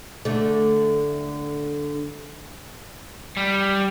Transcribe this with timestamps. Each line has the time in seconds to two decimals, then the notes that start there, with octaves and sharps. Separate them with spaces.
0.25 D3 A3
3.37 G3